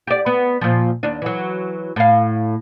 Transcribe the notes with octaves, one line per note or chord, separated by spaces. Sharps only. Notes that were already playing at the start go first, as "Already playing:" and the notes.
G4 D5
B3
A#2 F3
D#2 D4
E3 F#3
A2 F5